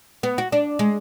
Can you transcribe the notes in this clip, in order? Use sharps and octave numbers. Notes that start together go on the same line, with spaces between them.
B3
F#4
D4
G#3